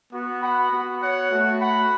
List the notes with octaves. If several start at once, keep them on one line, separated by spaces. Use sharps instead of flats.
B3 F#4
F#5 B5
B3 F#4
C#5 F#5
A3 F#4
F#5 B5